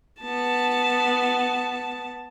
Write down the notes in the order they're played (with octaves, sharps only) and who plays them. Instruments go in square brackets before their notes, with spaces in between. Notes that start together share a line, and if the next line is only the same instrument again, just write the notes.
[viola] B3 A5